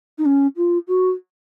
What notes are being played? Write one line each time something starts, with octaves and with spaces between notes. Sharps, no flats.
D#4
C#4
F4
F#4